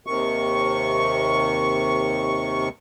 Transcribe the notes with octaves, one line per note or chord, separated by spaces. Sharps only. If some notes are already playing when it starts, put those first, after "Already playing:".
D#2 C3 D#3 C#6